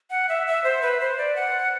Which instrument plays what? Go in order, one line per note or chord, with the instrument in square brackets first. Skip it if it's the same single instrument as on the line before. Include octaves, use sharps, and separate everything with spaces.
[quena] F#5
E5
E5
C5
B4
C5
D5
F#5